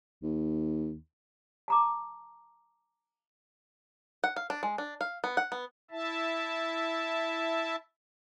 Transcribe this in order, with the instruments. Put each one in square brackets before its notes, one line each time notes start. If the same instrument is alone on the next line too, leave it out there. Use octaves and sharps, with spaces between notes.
[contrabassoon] D#2
[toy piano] A5 A#5 D6
[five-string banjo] F#5
F5
D4
G#3
D4
F5
B3
F#5
B3
[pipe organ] E4 E5 A5